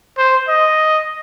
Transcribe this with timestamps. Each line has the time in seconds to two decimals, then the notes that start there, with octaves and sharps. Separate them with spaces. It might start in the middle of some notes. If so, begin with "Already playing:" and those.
0.18 C5
0.48 D#5